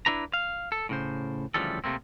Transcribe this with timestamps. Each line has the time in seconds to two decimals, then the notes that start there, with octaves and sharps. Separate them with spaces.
0.06 D4 E4 B4 A#5
0.34 F5
0.72 A4
0.89 A2 C#3 C5
1.54 D2 C#3 E3 F3 G3 A4
1.84 C3 A3 A#3 C4